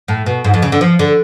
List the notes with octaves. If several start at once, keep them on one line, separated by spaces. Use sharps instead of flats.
A2
B2
G#2
F2
C#3
D3
F3
D3